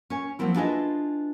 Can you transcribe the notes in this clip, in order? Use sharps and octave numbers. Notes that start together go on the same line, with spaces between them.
C#4 C#5 G#5
F3 F#3 A#3 C4 E4
D4 E4 F4 G#4 B4 D#5